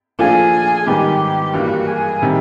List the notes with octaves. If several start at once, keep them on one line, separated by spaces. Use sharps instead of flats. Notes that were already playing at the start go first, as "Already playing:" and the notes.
A#2 F3 A3 D4 F4 G#4
G#2 D#3 G3 B3 G4
G2 E3 G3 A#3 F#4
G#4
C3 D#3 G3